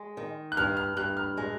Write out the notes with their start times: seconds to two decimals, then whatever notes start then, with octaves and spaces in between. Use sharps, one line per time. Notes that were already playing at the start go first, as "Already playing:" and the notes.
Already playing: G#3
0.17 D#3
0.52 F#6
0.57 G2 F6
0.77 F6
0.97 G2 F#6
1.17 F6
1.37 G#3